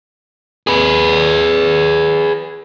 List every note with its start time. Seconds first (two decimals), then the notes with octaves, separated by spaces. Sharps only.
0.67 G#4 B4